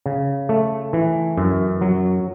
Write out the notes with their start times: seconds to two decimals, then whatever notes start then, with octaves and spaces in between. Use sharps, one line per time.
0.06 C#3
0.49 A3
0.93 E3
1.37 F#2
1.81 F#3